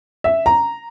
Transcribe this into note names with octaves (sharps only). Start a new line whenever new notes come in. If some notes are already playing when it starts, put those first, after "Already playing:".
E5
A#5